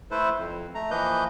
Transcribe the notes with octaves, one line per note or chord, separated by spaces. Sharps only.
A3 E4 A4 B4 C5
F2
A3 A#5
E3 F3 A#3 B4 D#5 G6